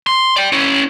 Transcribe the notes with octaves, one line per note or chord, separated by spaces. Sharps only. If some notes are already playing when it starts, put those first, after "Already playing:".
C6
D5 G5
C#4 E4